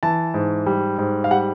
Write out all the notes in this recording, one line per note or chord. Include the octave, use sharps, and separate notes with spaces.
E3 A5
G#2
G3
G#2
F5
G3 F#5